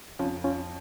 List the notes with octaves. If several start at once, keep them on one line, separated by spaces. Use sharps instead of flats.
F2 C#4 F4
C#4 F4